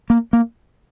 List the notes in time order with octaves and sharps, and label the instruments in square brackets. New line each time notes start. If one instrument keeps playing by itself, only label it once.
[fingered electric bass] A#3
A#3